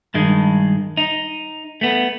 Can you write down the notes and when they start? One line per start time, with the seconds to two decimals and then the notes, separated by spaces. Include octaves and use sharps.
0.14 G2 D#3 G#3
0.97 D#4
1.81 A3 B3